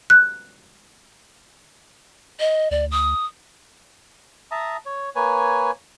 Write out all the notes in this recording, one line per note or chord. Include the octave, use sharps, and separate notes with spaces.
F#6
D#5
D2 D5
D#6
E5 A5 A#5 D#6
C#5
A#3 B4 C#5 G#5